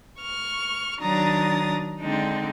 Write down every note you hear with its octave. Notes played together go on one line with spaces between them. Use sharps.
C#6 F6
D#3 F#3 D4 A#5 D#6 A6
D3 G#3 C4 D4 D#4